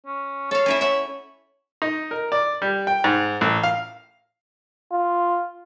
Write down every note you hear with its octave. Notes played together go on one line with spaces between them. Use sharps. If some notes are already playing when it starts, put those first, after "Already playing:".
C#4
A4 C#5 F5
C#4 E4 E5
C#5 E5 F#5
D#4
A#4
D5
G3
G5
G#2
A1
F5
F4